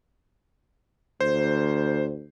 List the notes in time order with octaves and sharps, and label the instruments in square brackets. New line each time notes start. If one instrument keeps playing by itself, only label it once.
[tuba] D2 [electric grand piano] C5